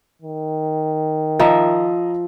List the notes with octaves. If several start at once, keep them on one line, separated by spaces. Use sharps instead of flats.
D#3
F3 D#5 E5 A#5